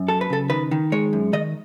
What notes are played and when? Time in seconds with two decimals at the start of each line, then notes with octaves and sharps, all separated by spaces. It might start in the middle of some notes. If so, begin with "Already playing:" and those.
Already playing: F#2
0.08 F#3 A4
0.21 B4
0.30 C#3 A4
0.50 D#3 B4
0.71 D#3
0.92 G#3 C#5
1.13 F#2
1.33 D#3 D#5